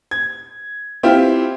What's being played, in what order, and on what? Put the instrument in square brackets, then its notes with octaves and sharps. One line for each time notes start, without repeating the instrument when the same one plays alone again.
[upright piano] G#6
C4 E4 F4 G4